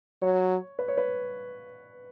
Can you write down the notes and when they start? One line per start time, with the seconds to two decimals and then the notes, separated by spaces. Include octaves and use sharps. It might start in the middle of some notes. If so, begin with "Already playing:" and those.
0.22 F#3 C#5
0.79 B4
0.88 C#5
0.98 B4